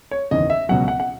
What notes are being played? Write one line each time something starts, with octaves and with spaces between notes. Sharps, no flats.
C#5
F#1 E2 D#3 D#5
E5
C#2 B2 F#3 F#5
F#5
F#5